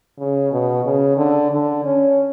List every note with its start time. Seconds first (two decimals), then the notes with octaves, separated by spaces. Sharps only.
0.19 C#3
0.52 B2
0.85 C#3
1.17 D3
1.51 D3
1.84 C#4